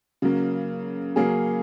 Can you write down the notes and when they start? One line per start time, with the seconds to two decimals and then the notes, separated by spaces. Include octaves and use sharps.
0.22 C#3 F#3 A#3
1.16 C#3 F#3 A#3 C#4 G#4